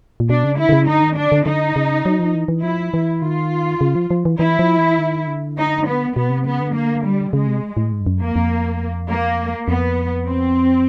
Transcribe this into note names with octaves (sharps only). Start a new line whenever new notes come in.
A#2
B2 D4
C#3
D3 E4
D3
C#3
D3 D#4
D#3
D3 D4
D3
D3 D#4
C#3
F#3
F3
E3
E3
F3 E4
E3
D#3 F4
C#3
F3
F3
E3
E3 E4
F3
E3
D#3
D3
D#4
B3
B2 B3
C3
C#3 B3
D3
A#3
G3
C#3 G#3
C3
A2
G#2
G2
F#2
F2 A#3
F2
A#3
F2 B3
C4